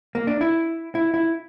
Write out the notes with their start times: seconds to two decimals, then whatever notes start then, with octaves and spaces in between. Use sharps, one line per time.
0.15 A#3
0.27 D4
0.41 E4
0.95 E4
1.14 E4